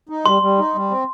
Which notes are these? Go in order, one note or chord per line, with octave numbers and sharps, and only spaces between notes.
D#4
G3 C6
G3
D#4
G3
C4